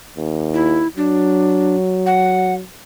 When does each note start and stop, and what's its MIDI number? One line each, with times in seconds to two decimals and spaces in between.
0.17 0.84 39
0.54 0.88 64
0.97 2.63 54
0.97 1.76 62
2.06 2.54 78